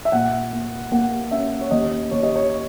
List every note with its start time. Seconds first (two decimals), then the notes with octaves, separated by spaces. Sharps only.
0.05 E5
0.12 A#2 F#5
0.53 A#3
0.92 A#3 F#5
1.31 C#4 E5
1.61 C#5
1.71 D#2 D#5
2.11 D#2 C#5
2.23 D#5
2.36 C#5